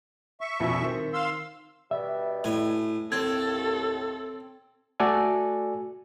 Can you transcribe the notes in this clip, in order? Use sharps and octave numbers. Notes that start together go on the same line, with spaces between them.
E5 C#6
A#1 F2 B2
D#3 C4
F5 C6 E6
G2 B2 G3 E5
A2 G#5
D#2 A2 C4 A4 G#6
A3 F#4 A4 D5 G#5